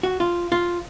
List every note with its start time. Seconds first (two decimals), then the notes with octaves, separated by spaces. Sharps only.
0.03 F#4
0.20 F4
0.52 F4